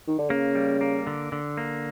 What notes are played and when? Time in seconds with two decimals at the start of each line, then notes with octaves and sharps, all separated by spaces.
0.07 D#3
0.18 D3
0.30 C#3 A#3
0.55 G3
0.81 A#3
1.07 D3
1.32 D3
1.57 A#3